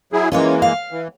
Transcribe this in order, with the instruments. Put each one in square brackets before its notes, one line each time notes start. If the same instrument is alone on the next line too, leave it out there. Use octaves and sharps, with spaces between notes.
[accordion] F#3 E4 G#4
[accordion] E3 G#3 A#3 [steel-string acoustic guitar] C#4 F4 C#5
[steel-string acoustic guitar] F5
[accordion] E3